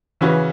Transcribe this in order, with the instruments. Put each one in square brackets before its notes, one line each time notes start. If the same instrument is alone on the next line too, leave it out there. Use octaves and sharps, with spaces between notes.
[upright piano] C#3 E3 C#4 F#4 B4